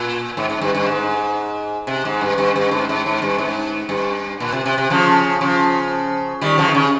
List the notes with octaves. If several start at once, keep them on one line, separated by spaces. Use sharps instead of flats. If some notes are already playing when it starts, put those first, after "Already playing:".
Already playing: A#2
G#2
G#2
G2
G2
G#2
C3
G#2
G2
G2
G2
G#2
G#2
G#2
G2
G#2
G2
A#2
C3
C3
C3
C#3 F3
C#3 F3
D#3 G3
C#3 F3
D#3
C#3